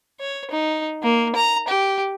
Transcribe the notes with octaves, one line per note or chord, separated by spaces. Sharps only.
C#5
D#4
A#3
A#5
G4